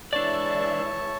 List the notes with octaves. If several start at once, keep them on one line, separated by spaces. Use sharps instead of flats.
E3 G#3 D4 C#5 D5 E5 A5